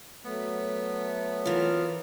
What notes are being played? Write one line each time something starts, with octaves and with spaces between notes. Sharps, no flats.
F#3 A3 B3
F2 E3 C#4 F4 A#4